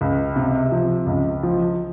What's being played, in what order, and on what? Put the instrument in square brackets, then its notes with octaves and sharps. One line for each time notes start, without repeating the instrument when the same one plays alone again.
[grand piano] C#2
C3
F3
C#2
F3